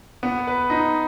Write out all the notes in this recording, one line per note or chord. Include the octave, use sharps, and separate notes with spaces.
B3
B4
D#4